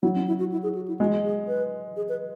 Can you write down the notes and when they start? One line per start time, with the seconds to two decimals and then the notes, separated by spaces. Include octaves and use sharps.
0.03 F#3 E4
0.15 C#4
0.28 E4
0.39 F#4
0.52 E4
0.63 G#4
0.75 F#4
0.88 E4
0.99 G#3 F#4
1.24 G#4
1.48 B4
1.96 G#4
2.09 B4